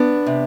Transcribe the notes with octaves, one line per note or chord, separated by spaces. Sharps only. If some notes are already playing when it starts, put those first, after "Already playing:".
Already playing: E2 B3 D4
C3